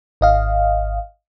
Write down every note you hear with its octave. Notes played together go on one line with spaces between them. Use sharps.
G#1 D#5 F5